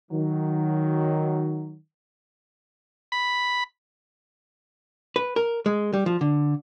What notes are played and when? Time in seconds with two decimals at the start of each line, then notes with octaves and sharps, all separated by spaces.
0.11 D#3 F#3
3.12 B5
5.16 B4
5.36 A#4
5.66 G#3
5.93 G3
6.06 F3
6.21 D3